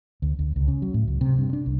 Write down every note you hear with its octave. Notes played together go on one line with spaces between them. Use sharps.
D2
D2
C#2
C#3
F#3
A2
C#2
C3
G2
D4
C2